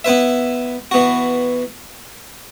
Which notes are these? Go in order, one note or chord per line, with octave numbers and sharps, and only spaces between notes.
B3 E4 B4 E5
E3 B3 F#4